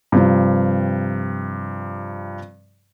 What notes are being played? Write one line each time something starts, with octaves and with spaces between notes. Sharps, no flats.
G2 C3 F3